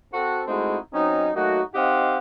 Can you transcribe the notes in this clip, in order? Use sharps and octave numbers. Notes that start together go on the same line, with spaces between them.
C4 F#4 A4
G#3 A3 C4 D#4 E4 F#4
F#3 C4 C#4 D#4
F#3 A3 A#3 D#4 F#4
C4 D#4 G4 D#5 F5 F#5